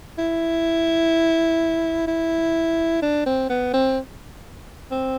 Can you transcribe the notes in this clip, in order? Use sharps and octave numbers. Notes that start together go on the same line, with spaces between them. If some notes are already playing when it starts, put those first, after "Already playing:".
E4
E4
D4
C4
B3
C4
C4